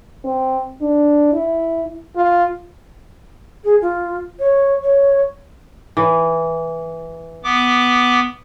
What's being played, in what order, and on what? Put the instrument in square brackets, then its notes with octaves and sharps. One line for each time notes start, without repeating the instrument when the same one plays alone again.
[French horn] C4
D4
E4
F4
[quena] G#4
F4
C#5
C#5
[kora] E3
[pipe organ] B3 D6